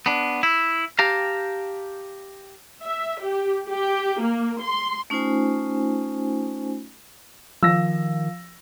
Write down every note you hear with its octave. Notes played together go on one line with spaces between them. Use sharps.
B3 D4
E4
G4 F5 G5 A5 A#5
E5
G4
G4
A#3
C6
A3 C#4 D#4 F4 C5 G#5
D#3 F3 E6 A#6